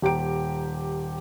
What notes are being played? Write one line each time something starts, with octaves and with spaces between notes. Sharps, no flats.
D#1 G4 A#5 D7